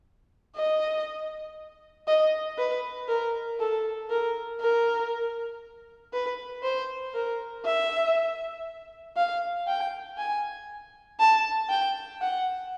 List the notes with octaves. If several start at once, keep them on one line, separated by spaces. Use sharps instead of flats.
D#5
D#5
B4
A#4
A4
A#4
A#4
B4
C5
A#4
E5
F5
G5
G#5
A5
G5
F#5